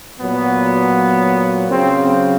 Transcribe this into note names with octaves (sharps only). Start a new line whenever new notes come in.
A#2 F#3 B3
C#3 F#3 C4